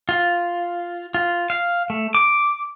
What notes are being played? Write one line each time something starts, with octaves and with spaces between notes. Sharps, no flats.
F4
F4
F5
A3
D6